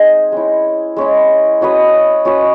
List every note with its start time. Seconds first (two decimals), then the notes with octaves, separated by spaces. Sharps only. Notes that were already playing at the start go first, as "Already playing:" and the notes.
Already playing: G#3 C4 D#4 G#4
0.32 G#3 C#4 E4
0.96 G#3 C#4 E4
1.61 C#4 F#4 B4 D#5
2.25 C#4 F#4 B4 D#5